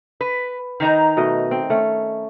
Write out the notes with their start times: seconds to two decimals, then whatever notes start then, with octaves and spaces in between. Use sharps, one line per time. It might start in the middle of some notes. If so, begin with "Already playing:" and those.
0.21 B4
0.80 D#3 D#4 A#5
1.17 B2 A3 D#5
1.51 C4
1.70 A3 C#4